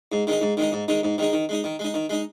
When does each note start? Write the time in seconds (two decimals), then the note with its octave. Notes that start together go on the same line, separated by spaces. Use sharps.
0.12 G#2
0.27 D#3 G#3 D#4
0.42 G#2
0.57 D#3 G#3 D#4
0.72 G#2
0.88 D#3 G#3 D#4
1.03 G#2
1.18 D#3 G#3 D#4
1.33 D#3
1.49 G#3 D#4
1.64 D#3
1.79 G#3 D#4
1.94 D#3
2.10 G#3 D#4